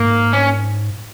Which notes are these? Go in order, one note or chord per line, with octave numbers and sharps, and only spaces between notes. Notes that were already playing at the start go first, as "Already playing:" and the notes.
Already playing: G#2 A#3
C#4